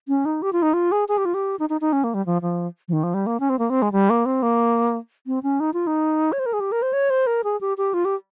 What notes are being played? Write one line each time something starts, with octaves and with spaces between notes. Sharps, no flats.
C#4
D#4
G4
F4
D#4
F4
G#4
G#4
G4
F4
G4
D#4
D#4
D#4
C#4
A#3
G3
F3
F3
F3
D#3
F3
G3
A#3
C#4
C4
A#3
C4
G#3
G3
A#3
C4
A#3
C4
C#4
D#4
F4
D#4
C#5
C5
A#4
G#4
G4
A#4
C5
C#5
C5
A#4
G#4
G4
G4
F4
G4